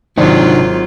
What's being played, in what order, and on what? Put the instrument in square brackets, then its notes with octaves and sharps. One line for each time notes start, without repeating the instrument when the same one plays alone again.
[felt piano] G#1 D5 [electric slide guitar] C3 D4 D#4 [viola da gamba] F#3 F4